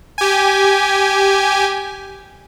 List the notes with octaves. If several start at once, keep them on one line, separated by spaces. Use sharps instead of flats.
G4 G#5